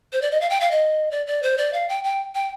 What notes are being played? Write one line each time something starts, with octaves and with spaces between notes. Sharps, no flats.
C5
D5
D#5
F5
G5
F5
D#5
D5
D5
C5
D5
F5
G5
G5
G5